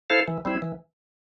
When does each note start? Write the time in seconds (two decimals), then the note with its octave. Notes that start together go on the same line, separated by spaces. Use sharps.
0.10 E4 A4 C5 F5
0.28 E3
0.45 G3 C4 E4
0.62 E3